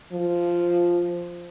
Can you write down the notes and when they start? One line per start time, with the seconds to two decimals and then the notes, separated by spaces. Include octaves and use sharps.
0.12 F3